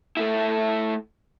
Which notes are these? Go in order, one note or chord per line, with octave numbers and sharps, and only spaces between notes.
A3 E4